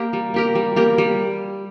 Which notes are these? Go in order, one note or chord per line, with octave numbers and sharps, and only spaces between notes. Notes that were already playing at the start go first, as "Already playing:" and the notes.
Already playing: A#3 G4 A#4
G3
A#3 G4 A#4
G3
A#3 G4 A#4
G3